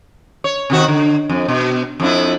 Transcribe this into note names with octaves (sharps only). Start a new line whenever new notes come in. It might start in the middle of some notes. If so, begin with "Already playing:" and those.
C#5
C3 D#3 F#4
D3
F2
B2
F2 D4 E4